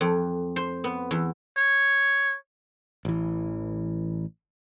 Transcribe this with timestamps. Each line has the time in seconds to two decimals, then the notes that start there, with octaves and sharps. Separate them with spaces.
0.01 F2
0.56 C5
0.84 B3
1.11 E2
1.57 C#5
3.05 A1 E3